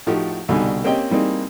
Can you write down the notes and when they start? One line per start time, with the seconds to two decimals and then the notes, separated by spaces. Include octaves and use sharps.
0.07 A2 F3 A3 D#4 F#4 G4
0.48 C2 B2 D3 G3 D#4 G#5
0.84 A#3 C4 C#4 G4 D#5 G5
1.10 E3 G3 A#3 C4 D#4 G#4